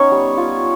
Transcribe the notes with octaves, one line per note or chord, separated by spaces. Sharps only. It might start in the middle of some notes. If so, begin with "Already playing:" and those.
Already playing: B3 C#4 D#4 C#5
G3
F4